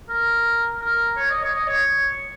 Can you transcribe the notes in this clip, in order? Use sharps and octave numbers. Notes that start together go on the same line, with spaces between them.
A#4
A#4
C#5
D#5
C#5
D#5
C#5